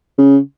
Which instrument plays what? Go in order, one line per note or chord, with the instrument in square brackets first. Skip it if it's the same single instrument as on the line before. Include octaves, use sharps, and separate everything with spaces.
[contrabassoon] C#3